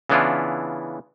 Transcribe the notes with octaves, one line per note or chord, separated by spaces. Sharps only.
C#3 E3 B3 D4 E4 F4